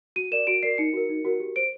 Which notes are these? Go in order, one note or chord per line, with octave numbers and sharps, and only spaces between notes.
F#4 D#7
A#4 D5 E7
F#4 D7
A#4 D5 C7
D#4 C#7
F#4 A#4
D#4
F#4 A#4
G4
C5 D7